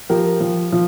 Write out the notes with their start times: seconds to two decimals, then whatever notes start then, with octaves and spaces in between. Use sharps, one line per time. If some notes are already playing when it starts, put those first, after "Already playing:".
0.09 F3 G4 A#4
0.40 F3
0.72 F3